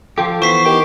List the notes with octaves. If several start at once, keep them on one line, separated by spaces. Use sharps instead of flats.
F3 F4 G4 A4
E3 B3 C5 C#6 B6 C7
D#3 G4